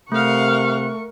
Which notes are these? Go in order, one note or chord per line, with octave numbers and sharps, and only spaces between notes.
C3 A3 A#4 F5 F#5 C#6